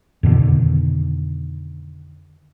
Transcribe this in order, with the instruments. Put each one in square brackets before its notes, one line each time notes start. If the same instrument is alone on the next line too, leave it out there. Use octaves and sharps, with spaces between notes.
[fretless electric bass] F2 B2 D3 D#3